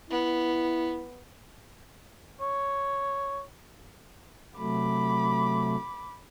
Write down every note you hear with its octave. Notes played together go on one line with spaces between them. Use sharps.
B3 E4
C#5
C3 F#3 A3 B5 D6